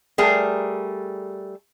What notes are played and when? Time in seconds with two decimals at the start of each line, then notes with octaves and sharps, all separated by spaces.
0.18 G3 A3 G#4 A#4